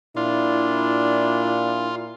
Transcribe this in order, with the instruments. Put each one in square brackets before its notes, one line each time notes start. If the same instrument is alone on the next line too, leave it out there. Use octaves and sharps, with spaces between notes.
[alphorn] A#2 [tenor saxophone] D4 [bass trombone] E4 [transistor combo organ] F4